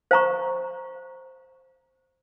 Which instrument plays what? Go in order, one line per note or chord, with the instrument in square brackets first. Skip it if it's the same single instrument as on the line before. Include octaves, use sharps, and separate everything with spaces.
[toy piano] C5 F5 A#5 C#6